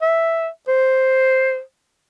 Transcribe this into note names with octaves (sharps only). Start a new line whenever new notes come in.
E5
C5